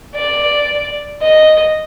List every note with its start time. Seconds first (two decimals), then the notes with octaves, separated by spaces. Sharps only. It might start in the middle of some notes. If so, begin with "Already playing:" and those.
0.15 D5
1.22 D#5